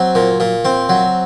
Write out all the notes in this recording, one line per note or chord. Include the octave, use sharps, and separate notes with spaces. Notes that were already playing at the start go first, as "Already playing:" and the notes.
Already playing: F#3 C4
A#2
A#2
C4
F#3